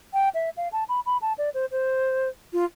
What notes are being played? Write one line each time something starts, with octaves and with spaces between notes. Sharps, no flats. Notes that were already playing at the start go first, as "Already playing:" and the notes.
G5
E5
F5
A5
B5
B5
A5
D5
C5
C5
F4